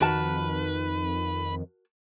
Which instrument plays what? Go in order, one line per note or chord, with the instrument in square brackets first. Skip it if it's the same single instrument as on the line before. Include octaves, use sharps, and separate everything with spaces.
[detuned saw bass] F2 [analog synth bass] D#3 [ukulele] F#4 A#4 A5 [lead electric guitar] B4